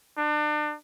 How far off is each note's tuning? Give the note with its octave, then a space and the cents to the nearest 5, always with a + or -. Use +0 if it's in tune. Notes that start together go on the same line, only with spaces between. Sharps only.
D4 +35